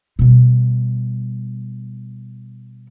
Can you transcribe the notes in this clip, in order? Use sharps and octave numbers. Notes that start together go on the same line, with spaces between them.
B2 G3